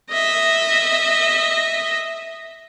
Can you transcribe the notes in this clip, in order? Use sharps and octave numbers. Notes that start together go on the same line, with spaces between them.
D#5 E5